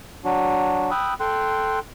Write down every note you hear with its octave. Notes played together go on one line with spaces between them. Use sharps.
F#3 D4 F#4
G5 B5 D#6 E6 F#6
A4 G5 C6 F#6